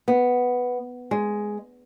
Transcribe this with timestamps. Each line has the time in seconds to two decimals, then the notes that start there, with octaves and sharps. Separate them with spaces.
0.08 B3
1.11 G#3